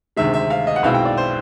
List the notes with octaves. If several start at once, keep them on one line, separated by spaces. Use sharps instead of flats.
D2 C3 D#3 G#3 E5
E5
F5
D#5
F#5
B1 B2 G#3 C4 E4 F5
G5
D5
C5